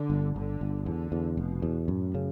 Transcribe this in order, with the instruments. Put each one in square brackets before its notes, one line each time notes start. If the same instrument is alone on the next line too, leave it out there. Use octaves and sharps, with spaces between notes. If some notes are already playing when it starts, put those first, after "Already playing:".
Already playing: [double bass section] D3
[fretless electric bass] G1
[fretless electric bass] G1 [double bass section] D3
[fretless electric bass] G1
[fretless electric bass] E2 [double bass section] D3
[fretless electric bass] E2
[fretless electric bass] F1 [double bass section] B2
[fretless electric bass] E2
[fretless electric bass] F#2 [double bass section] A2
[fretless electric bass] C#3